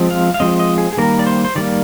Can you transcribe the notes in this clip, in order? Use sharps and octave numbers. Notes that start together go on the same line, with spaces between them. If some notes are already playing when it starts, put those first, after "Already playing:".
Already playing: F3 G#3 C4
F5
F5
F3 G#3 C4 D#5
D#5
G#4
G#4
D#3 G3 A#3 A#4
D5
C5
C5
D#3 G3 A#3 D5